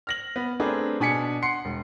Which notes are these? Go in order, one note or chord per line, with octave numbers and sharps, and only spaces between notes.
F6 A#6 F#7
B3
A3 C4 D4 G#4 A#4 B4
B2 D4 G#5 B6 C#7
F#5 C6 C7 C#7
E1